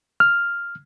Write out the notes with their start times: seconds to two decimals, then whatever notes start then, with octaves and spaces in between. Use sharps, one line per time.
0.20 F6